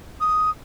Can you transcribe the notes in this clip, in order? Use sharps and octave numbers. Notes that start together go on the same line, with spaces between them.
D#6